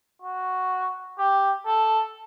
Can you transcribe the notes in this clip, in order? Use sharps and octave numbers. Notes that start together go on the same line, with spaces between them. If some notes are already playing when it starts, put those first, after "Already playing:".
F#4
G4
A4